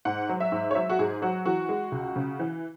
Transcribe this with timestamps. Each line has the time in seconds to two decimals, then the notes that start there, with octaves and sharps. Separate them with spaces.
0.05 G#2 F#5
0.29 F#3
0.40 E5
0.52 G#2
0.71 C#5
0.75 F#3 E5
0.89 F#4
0.99 G#2 G#4
1.22 F#3 F#4
1.45 E3 F#4
1.69 G#3
1.92 C#2
2.16 C#3
2.39 E3